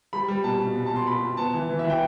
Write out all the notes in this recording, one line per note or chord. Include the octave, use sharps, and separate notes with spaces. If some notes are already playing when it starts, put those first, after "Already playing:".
G3 B5
G3
B2 A5
B2
B2
A5
B2
C6
B2 B5
B2
B3 A5
E3
E3
E5
E3
G5